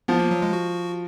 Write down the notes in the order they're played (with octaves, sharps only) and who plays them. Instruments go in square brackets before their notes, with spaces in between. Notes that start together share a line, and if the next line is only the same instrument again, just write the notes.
[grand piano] F3 [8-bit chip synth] B3
[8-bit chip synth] A#3
F#3
G#3
F#4